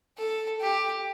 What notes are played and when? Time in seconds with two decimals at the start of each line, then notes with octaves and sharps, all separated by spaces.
0.18 A4
0.61 G4